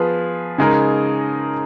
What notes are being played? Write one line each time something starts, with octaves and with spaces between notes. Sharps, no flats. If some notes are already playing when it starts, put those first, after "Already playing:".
Already playing: F3 B3 F4 G#4 B4
C#3 G#3 D#4 A#4